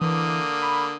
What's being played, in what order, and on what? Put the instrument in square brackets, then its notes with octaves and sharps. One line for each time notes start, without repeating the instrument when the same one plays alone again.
[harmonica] D3 A#3 D#6 [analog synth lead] E3
[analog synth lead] B5